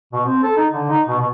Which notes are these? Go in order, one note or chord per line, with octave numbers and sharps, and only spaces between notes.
B2
C4
A4
D#4
D3
D#4
B2
B2